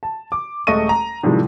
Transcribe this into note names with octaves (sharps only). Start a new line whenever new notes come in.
A5
D6
D#1 G#3 A3 D#5 C#6 D#7
A#5
A2 C3 D#3 F3 G3 G#3